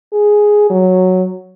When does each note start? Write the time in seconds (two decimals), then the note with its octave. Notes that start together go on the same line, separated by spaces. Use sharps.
0.13 G#4
0.70 F#3